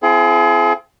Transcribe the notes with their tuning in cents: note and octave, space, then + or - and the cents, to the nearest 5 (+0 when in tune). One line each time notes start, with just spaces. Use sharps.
C4 -10 E4 +45 G#4 +35